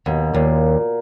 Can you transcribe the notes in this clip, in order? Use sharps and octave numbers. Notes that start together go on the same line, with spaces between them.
D#2 B2
D#2 A#2